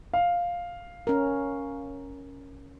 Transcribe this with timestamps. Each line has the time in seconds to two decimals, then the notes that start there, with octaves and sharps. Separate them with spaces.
0.14 F5
1.07 C#4 A#4